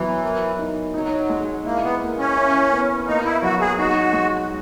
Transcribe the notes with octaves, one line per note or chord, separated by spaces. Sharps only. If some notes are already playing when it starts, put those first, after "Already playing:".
Already playing: E3 F#3 B3
A#4
D#4
F#3 D#4
G#3
A#3 E4
B3
A#3
C#4
E4
B3
A#3 D#4
E4
F#3 F#4
G#4
D#4 F#4
G#3